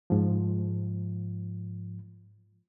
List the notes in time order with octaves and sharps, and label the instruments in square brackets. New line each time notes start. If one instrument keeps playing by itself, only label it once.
[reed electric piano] G#2 F3